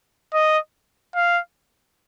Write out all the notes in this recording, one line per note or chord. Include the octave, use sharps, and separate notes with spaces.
D#5
F5